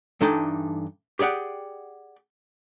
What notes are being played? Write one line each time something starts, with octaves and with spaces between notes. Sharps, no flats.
G2 E3 D4 D#4 A4 G5
G4 G#4 D5 F#5 G5